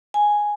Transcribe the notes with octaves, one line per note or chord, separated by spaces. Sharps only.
G#5